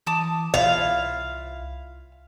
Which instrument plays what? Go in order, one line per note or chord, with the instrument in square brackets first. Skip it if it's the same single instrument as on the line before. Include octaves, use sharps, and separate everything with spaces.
[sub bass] E3 [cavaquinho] A5 D6 D#6
[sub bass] C2 [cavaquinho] E4 F4 [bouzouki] F5